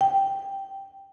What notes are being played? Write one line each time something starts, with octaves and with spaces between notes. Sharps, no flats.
G5